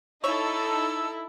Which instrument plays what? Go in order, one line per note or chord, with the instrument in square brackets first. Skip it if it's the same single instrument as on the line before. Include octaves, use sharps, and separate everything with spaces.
[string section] D#4 A4 [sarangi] E4 [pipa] C#5 [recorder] E6